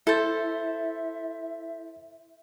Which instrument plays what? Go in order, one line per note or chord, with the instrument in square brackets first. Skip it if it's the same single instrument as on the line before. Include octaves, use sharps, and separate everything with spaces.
[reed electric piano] E4 A6 [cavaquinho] A4 C5 [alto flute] E5